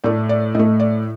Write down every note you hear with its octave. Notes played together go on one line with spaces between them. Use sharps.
A2 A3 D5
D5
A2 A3 D#5
D5